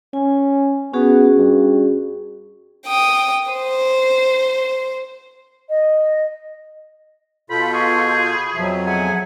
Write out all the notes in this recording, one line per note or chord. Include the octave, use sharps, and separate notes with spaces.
C#4 G#5
B3 C#4 F#4 G#4
G2
G5 D#6
C5
D#5
B2 F4 A4 B5 G6
G#4 C#6
B5
F2 B2 F3 F#3 E5
G#4 E5 F#5 G#5